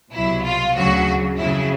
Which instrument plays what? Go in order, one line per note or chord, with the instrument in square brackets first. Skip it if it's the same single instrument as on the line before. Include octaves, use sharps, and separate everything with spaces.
[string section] C2 B2 F#3 E4
F4
D2 C#3 F#3 F#4
F2 C#3 F#3 E4